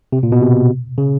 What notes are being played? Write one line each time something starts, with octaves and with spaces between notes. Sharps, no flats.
C3
A#2
B2
C3
C#3